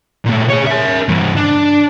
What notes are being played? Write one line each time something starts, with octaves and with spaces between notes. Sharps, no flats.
A#2 A3
G#4 C#5
A#4 E5
G2 E3
D4